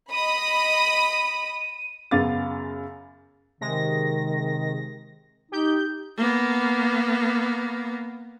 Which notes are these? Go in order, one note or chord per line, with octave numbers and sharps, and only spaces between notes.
D#5 B5 D#6 D#7
F#2 C#3 B3 F5 D6 A6
C3 D#3 G#3 A#6
D#4 G4 G6
A#3 B3